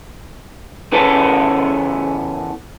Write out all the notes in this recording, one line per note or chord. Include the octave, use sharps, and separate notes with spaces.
C#3 E3 B3 C#4 A4